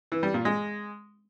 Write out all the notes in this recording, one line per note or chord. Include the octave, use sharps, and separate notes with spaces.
E3
G3
A#2
G#3